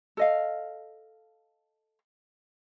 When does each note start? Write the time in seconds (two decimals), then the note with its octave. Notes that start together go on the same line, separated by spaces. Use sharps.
0.17 A4 D#5 F5